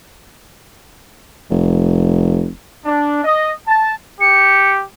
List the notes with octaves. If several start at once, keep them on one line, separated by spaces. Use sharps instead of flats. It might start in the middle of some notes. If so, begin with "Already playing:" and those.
F1
D4
D#5
A5
G4 C#7